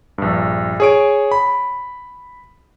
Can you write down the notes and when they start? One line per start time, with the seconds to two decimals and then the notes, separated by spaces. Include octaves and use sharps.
0.18 A#1 G2
0.80 G#4 C#5 D7
1.32 B5